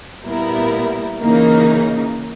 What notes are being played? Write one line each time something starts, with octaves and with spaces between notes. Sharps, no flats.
A#2 G3 B3 E4 A#4
C#3 E3 A#3 D#4